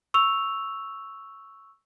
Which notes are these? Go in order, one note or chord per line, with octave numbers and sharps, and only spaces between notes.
C#6 E6 F7